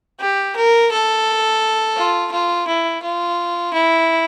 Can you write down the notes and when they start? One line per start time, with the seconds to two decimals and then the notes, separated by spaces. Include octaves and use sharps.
0.20 G4
0.56 A#4
0.92 A4
1.97 F4
2.32 F4
2.68 E4
3.03 F4
3.74 E4